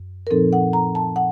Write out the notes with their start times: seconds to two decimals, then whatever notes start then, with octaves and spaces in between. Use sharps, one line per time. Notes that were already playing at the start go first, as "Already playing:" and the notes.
Already playing: F#2
0.27 A#4
0.30 A#2 F3 C4 D#4 A4
0.53 F#5
0.73 A#5
0.95 A5
1.16 F#5